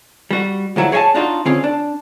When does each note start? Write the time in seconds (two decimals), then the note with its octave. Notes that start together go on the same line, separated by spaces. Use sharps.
0.31 G3 F#4
0.76 D2 F3 F#3 E4 F#5
0.92 G#4 C#5 D#5 E5 G#5 A5
1.14 D4 D#4 F4 F#4
1.45 D3 C4 C#4 F4 G#4
1.64 D4